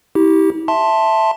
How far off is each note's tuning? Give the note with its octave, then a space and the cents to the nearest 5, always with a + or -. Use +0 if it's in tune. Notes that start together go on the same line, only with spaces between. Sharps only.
E4 -40 G4 -10
E5 +0 A5 +5 C6 +10